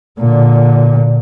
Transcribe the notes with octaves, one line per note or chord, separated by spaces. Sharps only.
A#2 D3